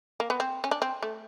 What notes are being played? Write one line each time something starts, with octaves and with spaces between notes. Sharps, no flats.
A#3
B3
C4
C#4
D4
C4
A3